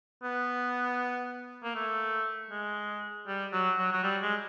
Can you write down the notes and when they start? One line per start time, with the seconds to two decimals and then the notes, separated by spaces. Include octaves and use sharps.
0.23 B3
1.64 A#3
1.75 A3
2.51 G#3
3.28 G3
3.53 F#3
3.78 F#3
3.93 F#3
4.03 G3
4.22 G#3